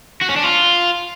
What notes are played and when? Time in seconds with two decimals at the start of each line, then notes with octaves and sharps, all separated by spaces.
0.21 F#4
0.29 C#4
0.36 D4
0.44 F4